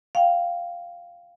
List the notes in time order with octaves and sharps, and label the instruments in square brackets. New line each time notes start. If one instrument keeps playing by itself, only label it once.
[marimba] F5 G5